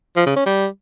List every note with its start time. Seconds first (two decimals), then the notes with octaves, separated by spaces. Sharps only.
0.17 F3
0.26 C#3
0.36 C#4
0.46 G3